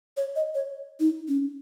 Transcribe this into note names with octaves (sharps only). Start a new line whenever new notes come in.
C#5
D#5
C#5
D#4
C#4